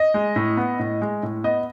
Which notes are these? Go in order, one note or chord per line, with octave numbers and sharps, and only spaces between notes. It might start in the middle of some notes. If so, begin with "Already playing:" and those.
Already playing: D#5
G#3
A2
B3
A2
G#3
A2
B3 D#5